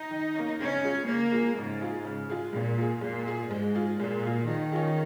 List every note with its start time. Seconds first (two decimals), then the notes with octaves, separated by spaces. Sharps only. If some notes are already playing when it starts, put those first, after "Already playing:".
Already playing: D#4
0.11 D#3
0.35 A#3 C#4
0.59 C#3 C#4
0.84 G#3 F4 G#4
1.08 C#3 A#3
1.32 G#3 F4 G#4
1.57 G#2 C#3
1.81 G#3 F4 G#4
2.05 C#3
2.30 G#3 F4 G#4
2.53 A#2 G#3
2.78 F4 G#4
3.01 A#2 G#3
3.26 F4 G#4
3.51 G#2 G#3
3.75 F4 G#4
3.98 A#2 G#3
4.23 F4 G#4
4.47 D#3 F3
4.72 C#4 F4 G#4